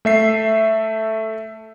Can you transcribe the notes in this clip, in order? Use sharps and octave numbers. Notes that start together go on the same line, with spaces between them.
A3 E5 C7